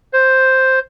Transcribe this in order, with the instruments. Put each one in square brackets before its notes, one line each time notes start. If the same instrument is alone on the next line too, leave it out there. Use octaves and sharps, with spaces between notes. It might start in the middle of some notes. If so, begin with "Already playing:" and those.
[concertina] C5